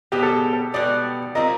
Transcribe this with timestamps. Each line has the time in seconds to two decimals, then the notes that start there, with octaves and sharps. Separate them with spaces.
0.12 B2 G3 B3 G4
0.23 A4
0.33 G#4
0.53 A4
0.74 B2 G3 B3 D5
1.35 G3 C4 F4 A#4 D#5